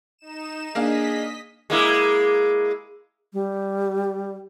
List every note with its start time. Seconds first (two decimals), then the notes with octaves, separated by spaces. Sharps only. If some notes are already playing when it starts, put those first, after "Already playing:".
0.18 D#4 E7
0.75 A#3 D4 G#4 D#5 F5 B6
1.70 G#3 A#3 E4
3.33 G3